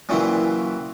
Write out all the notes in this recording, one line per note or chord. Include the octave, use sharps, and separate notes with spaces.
A#2 C#3 E3 F#3 C4 E4